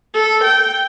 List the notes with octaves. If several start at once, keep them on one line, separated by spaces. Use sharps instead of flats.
A4
G5